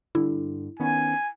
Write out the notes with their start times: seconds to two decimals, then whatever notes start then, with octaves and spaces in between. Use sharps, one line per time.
0.15 G2 D3 E4
0.80 D#3 B3 C#4 G#5